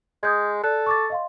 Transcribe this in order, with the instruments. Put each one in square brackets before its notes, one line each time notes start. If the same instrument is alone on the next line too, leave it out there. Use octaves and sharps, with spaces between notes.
[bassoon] G#3 [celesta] D#6 G6 G#6
[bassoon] A4 [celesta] D5 F#6
[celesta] C#6 D6 A6
D#5 F5 C6